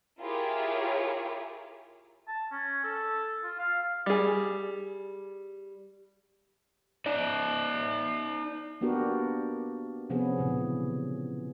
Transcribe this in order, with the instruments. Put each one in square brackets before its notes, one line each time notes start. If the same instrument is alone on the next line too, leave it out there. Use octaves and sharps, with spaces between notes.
[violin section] E4 F4 G4 G#4 A#4 C#5
[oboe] A5
C#4
A4
F4
F5
[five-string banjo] G3 G#4
[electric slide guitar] D#4 D5
[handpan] A#3 B3 D4 F#4 G4 A#4
C3 F3 B3 C#4 G#4
A#2 C#3 E3